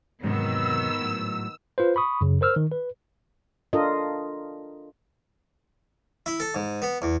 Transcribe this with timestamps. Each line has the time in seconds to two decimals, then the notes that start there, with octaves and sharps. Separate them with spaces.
0.23 E2 G#2 C3 D#3 F#3 B3 E6
1.01 A2 F#3
1.78 F4 B4 C5
1.96 B5 C#6 D#6
2.21 F#2 C#3
2.41 A#4 C5 E6 F6
2.56 D#3
2.71 B4
3.73 D4 F4 A4 A#4 D#5
6.26 E4
6.40 A4
6.55 G#2
6.82 B3
7.02 E2